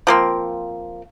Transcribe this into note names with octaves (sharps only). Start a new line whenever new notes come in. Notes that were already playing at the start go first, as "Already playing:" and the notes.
F3 A#3 C4